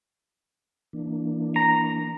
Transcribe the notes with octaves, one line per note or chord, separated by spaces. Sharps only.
E3 A#3 D4
A#5